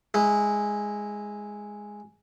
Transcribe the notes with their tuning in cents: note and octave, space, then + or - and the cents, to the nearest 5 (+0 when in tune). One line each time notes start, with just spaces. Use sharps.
G#3 +0 E4 -15